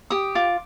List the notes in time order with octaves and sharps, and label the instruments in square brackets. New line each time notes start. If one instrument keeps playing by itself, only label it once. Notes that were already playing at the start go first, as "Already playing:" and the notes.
[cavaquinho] G4 D#6
F4 D6